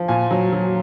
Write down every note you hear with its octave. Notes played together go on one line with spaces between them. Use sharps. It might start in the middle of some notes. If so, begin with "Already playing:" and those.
Already playing: F3
A#2 G#5
F#3
F#3